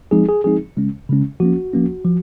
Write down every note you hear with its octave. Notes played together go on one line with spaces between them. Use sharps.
F3 G#3 C4 D#4 G#4
G#4
F3 G#3 C4 D#4 G#4
C#3 G#3 C#4
C#3 G#3 C#4
F3 A#3 C#4 F#4
F3 A#3 C#4
F3